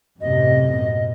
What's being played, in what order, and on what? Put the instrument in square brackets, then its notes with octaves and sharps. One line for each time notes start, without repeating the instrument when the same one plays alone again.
[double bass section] F#2 A2 C3 [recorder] D#5
[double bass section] B2